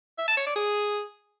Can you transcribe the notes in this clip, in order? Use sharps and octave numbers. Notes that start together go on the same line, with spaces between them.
E5
A5
C#5
D5
G#4